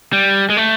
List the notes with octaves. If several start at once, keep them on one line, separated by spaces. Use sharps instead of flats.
G3
G#3
A3